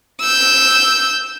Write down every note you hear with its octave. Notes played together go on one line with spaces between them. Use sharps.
E6 G6